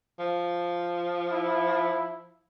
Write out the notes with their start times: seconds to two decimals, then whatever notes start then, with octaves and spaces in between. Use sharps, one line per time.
0.19 F3
1.32 E4